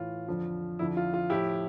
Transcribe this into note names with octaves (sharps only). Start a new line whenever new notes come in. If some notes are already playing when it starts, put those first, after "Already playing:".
Already playing: A2 E3 F4
F2 D3 F3
F2 D3 F3 E4
F4
F4
A2 F3 E4 G4